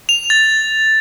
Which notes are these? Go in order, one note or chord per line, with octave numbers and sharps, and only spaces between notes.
F7
A6